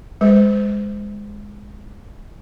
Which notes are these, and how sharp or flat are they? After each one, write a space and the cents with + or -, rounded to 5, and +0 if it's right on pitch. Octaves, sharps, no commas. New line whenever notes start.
G#3 -15 C5 -35